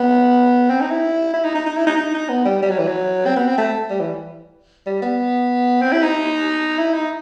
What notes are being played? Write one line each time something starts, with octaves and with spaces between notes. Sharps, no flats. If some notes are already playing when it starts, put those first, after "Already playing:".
Already playing: B3
C4
D#4
E4
E4
D#4
D#4
D#4
E4
D#4
D#4
D#4
B3
G3
G3
F#3
E3
F#3
C4
B3
C4
A3
G3
E3
G3
B3
C4
E4
D#4
E4
D#4